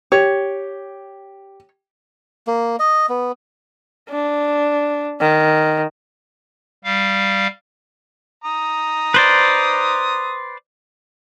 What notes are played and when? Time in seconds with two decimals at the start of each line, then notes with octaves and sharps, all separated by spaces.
0.12 G4 C#5
2.47 A#3
2.80 D#5
3.09 B3
4.09 D4
5.20 D#3
6.84 G3 F5
8.44 A#5 D#6
9.14 B4 C5 D5